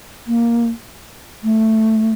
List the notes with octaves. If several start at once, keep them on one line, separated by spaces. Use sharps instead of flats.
A#3
A3